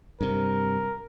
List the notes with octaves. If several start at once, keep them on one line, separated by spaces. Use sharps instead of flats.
G2 C3 A#4